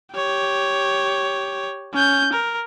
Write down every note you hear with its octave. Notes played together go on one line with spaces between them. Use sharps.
G4 C#5
C#4 G6
A#4